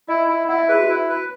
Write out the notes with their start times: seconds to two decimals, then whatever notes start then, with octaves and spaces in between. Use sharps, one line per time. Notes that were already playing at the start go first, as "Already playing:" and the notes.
0.08 E4 D#5
0.28 E4
0.48 E4 F#5
0.58 E5
0.68 G#4 B4
0.79 F#4
0.89 E4
1.09 B4